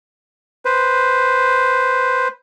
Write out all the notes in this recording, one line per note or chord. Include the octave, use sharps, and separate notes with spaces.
B4 C5